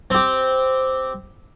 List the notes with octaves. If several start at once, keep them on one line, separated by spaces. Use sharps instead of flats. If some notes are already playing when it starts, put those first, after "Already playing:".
C4 G4